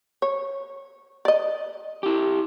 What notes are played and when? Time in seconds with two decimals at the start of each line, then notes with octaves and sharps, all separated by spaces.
0.22 C#5
1.25 D5 D#5
2.03 E4 G4